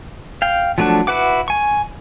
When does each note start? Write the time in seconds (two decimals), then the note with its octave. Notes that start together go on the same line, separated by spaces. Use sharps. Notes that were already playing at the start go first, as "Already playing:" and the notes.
0.42 F5 G5
0.78 F3 F#3 A3 D4 F#4
1.07 E4 F#4 B4 F#5 D6
1.48 G#5 C#6